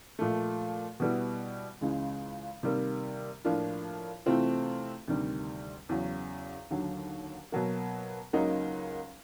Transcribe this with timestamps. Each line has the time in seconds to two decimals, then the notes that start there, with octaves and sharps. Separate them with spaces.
0.19 A#2 F3 A3
1.00 B2 G3 B3 E4
1.81 C#2 C#3 E3 G#3
2.63 C3 D#3 G3 A#3
3.45 A2 F3 A#3 D4 F4
4.26 C3 E3 A3 C4 F4
5.08 D2 C3 D#3 G3
5.89 E2 C#3 F#3
6.70 D#2 D3 F#3
7.52 B2 F#3 A#3
8.33 C#2 C#3 F#3 A#3 D#4